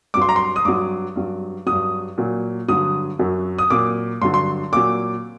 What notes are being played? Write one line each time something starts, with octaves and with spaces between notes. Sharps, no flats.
G2 F#3 C6 D6
A#5
C6
D#6
G2 F#3 D6
G2 F#3
G2 F#3 D#6
A#2 F#3
G2 D3 F#3 D#6
F#2 F#3
D#6
A#2 F#3 D6
G2 D3 F#3 C6
C6
A#2 F#3 D6